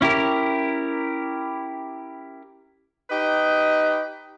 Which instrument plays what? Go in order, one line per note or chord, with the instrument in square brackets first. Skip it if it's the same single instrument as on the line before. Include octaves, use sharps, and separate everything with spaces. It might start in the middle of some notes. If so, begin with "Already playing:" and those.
[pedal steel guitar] C#4 E4 G4 A#4
[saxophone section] D#4 G4 B4 D#5